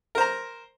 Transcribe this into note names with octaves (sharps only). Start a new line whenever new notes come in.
A#4 C5 A#5